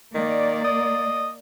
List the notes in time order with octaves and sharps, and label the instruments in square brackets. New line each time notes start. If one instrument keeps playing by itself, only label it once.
[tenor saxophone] D#3 [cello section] A#3 D5
[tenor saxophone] D#5